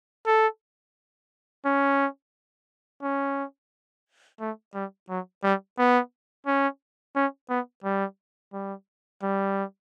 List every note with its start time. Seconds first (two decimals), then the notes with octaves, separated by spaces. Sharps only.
0.27 A4
1.65 C#4
3.02 C#4
4.40 A3
4.75 G3
5.09 F#3
5.43 G3
5.78 B3
6.47 C#4
7.16 C#4
7.49 B3
7.84 G3
8.53 G3
9.23 G3